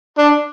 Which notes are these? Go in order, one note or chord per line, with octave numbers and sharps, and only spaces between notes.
D4